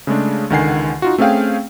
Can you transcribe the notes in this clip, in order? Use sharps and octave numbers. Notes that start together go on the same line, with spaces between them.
C#3 G#3 A3 D4
C#2 D3 D#3 F#5 G#5 C7
D#4 F4 F#4
A3 C4 C#4 G#4 F5 G5